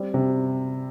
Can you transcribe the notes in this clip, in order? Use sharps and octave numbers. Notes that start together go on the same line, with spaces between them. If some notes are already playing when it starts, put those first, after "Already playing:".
Already playing: G3 C4
C3